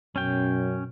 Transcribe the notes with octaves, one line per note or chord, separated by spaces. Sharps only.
F#2 B2 C#4 G5